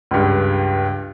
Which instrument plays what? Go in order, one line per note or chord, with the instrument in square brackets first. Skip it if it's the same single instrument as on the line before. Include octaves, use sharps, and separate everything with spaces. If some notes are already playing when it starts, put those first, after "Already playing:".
[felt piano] C#2 G2